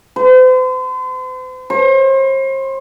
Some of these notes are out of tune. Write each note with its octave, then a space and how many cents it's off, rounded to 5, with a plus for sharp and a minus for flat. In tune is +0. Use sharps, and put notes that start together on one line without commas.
C5 -40
C5 +40